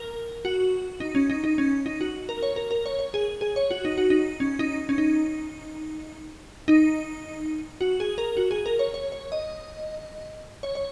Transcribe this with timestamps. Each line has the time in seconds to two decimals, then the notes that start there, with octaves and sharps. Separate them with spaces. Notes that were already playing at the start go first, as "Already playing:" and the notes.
Already playing: A#4
0.45 F#4
1.00 D#4
1.15 C#4
1.30 D#4
1.44 D#4
1.58 C#4
1.86 D#4
2.01 F#4
2.29 A#4
2.43 C#5
2.56 A#4
2.71 A#4
2.86 C#5
2.99 C#5
3.14 G#4
3.41 G#4
3.56 C#5
3.71 F#4
3.85 D#4
3.98 F#4
4.10 D#4
4.40 C#4
4.59 D#4
4.89 C#4
4.98 D#4
6.68 D#4
7.81 F#4
8.00 G#4
8.18 A#4
8.37 F#4
8.51 G#4
8.66 A#4
8.79 C#5
8.94 C#5
9.12 C#5
9.32 D#5
10.63 C#5
10.75 C#5